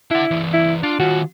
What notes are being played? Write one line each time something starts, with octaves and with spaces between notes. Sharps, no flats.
D4 E4 F#5
E3 C4
E4
D4 F4
D#3 F4 F#4